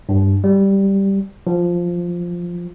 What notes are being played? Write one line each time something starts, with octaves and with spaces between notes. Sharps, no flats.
G2
G3
F3